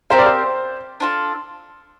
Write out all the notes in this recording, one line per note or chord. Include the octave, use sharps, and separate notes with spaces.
C4 G4 A#4 C5 F5
D5
C5
D4 F4 A4